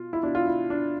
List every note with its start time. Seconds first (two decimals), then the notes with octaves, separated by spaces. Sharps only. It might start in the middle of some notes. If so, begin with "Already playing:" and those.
Already playing: B2 F4
0.13 E4
0.23 B2 D4
0.35 F4
0.47 E4
0.70 D4